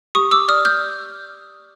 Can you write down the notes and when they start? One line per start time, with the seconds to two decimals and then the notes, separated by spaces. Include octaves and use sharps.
0.15 G4 C#6 D#6
0.31 D6 E6
0.48 D5 D#6 F6
0.65 F6 G6